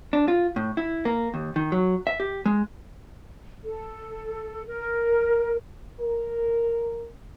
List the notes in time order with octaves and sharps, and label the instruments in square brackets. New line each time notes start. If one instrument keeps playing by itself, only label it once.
[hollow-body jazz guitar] D4
F4
A2
E4
A#3
D#2
D#3
F#3
E5
G4
G#3
[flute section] A4
A#4
[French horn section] A#4